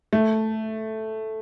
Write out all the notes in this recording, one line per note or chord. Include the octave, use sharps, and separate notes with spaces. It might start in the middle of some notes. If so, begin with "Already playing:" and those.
A3